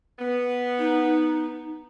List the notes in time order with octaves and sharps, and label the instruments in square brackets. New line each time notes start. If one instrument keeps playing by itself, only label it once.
[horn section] B3
[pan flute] D#4